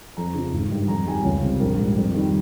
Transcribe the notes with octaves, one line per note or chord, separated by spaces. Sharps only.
F2 A#5
C#3 F3
G#1
G2 D#3 G3
F2 A#5
D#3 G3 G#5
C#2 C#5
C3 G3
A#1 A#4
G#2 G3
F2
D#3 G3